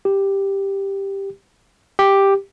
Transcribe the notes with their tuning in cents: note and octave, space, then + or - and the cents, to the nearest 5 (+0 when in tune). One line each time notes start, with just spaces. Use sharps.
G4 +5
G4 +5